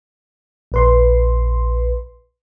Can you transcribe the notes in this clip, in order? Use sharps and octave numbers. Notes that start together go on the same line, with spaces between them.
A#1 B4 C6